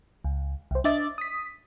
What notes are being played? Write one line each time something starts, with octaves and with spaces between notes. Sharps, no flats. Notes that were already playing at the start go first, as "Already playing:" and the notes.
C#2
C2 C5
D4 D#5 E5 D6 A6
D#6 B6